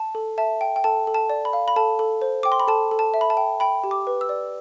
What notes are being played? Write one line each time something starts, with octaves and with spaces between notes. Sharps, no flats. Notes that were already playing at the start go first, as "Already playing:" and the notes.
Already playing: A5
A4
E5 A5
G5
G5
A4 A5
A4
A5
D5
B5
F5
B5
A4 A5
A4
C5
G5 D6
C6
B5
A4 A5
A4
A5
E5
B5
A5
G5
G5 B5
G4
D6
B4
E6
D5